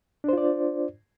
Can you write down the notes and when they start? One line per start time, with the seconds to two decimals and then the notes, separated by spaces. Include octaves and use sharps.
0.24 D4
0.29 C5
0.33 F4
0.38 D5